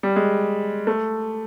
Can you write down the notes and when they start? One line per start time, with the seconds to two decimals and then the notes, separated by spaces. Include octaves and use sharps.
0.03 G3
0.16 G#3
0.87 A3